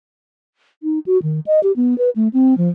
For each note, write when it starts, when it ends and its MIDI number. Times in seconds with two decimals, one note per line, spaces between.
0.83 0.99 63
1.06 1.21 66
1.23 1.40 51
1.46 1.60 75
1.63 1.72 67
1.76 1.97 59
1.98 2.10 71
2.16 2.28 57
2.33 2.57 60
2.58 2.69 53